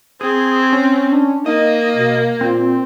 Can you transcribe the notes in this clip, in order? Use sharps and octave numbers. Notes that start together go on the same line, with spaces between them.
C4 G#4
C#4
D4
A#3 D#4 D#5
B2
A#2 C4